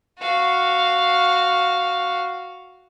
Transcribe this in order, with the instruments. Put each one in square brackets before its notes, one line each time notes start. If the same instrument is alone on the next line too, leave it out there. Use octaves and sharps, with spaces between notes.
[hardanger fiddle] F#4 F5